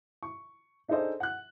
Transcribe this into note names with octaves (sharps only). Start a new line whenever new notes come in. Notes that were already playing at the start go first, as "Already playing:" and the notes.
C#6
D4 D#4 G#4 A4 C5 D#5
F#5 F#6